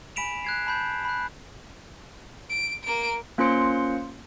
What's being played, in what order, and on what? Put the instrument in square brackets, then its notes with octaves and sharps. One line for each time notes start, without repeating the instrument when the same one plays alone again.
[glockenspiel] G#5 B5 B6 D7 E7 F7
F#6 G#6 C7
A5 B5 G6
B5 F#6
[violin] D7
A#3 D7
[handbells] A#3 C#4 F4 C5 C6 C#7